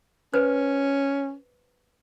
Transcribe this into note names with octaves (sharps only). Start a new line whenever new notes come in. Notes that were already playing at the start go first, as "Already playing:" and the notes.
C#4 B4 C5